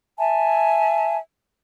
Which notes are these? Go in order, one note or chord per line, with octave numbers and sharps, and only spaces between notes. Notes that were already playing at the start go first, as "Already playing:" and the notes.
E5 G#5 A5